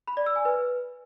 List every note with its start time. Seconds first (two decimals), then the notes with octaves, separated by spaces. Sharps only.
0.07 B5
0.17 D5
0.26 E6
0.36 G#5
0.45 B4